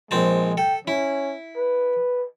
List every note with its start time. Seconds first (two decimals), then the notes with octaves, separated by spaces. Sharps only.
0.11 A#1 G#3 C4 A5
0.57 A4 G5
0.88 C#4 E4
1.57 B4